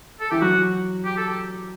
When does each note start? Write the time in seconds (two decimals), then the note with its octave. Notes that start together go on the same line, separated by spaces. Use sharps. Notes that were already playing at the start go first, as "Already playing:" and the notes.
0.21 A4
0.31 E3 G4
0.41 F#3 F#4
1.05 G4
1.17 A4
1.29 G4